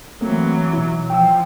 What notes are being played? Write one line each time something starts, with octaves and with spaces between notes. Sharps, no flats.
E3 F#3 A3 A#3 C4
B2 E4
F3 G5 E6